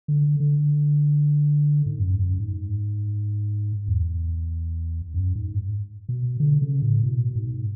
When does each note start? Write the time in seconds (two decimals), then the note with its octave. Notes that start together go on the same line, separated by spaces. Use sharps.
0.08 D3
0.40 D3
1.86 G#2
1.98 F#2
2.19 F#2
2.40 G#2
3.88 E2
5.14 F#2
5.35 G#2
6.09 B2
6.40 D3
6.62 C#3
6.82 A2
7.03 B2
7.35 G#2